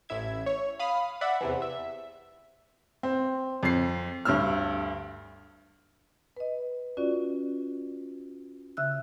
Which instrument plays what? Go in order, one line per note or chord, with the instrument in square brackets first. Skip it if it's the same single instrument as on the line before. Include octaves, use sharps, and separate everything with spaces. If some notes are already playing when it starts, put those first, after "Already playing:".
[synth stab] A1 E4 E5 G#6
C#5
F5 B5 D#6 F6
D5 E5 F#5 B5
E2 C3 E3
E5
[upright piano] C4
F2 C7
D2 G2 C#5 E6 F6
[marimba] B4 D#5
C#4 F4 F#4 D5
C#3 E5 E6 F#6